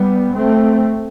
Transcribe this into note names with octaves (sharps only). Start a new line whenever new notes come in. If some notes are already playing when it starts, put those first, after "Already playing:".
Already playing: G3 B3
A3 C4